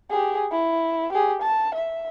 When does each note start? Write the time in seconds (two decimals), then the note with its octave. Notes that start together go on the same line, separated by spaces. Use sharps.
0.10 G4 G#4
0.51 E4
1.13 G4 G#4
1.42 A5
1.74 E5